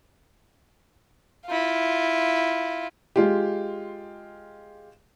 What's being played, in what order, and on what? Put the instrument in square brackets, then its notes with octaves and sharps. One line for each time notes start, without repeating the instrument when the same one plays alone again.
[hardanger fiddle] E4 F4
[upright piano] G#3 F4 G4